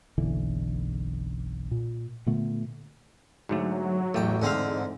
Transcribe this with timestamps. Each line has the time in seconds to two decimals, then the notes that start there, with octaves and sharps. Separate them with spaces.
0.17 F#1 B1 D3 E3
1.71 A#2
2.26 A#2 D3 A3 B3
3.49 G#2 D3 F#3 A3
4.14 A1 E2 A3 G5
4.42 G#2 D3 C4 F5